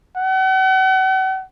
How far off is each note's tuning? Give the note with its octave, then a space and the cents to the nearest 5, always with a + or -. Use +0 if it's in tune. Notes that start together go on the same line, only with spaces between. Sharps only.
F#5 +40